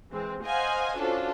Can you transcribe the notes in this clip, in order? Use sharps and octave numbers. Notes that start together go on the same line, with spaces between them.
E3 G#3 C4
C5 D#5 F5 F#5 G#5
C#4 D4 F4 F#4 A4 C5